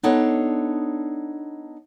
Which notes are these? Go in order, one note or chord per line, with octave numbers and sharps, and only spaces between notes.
B3 D4 D#4 A4 C#5